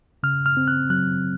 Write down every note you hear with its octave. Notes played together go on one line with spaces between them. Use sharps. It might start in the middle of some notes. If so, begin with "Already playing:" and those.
C#3 F6
F6
C4
F#6
F#3 F#6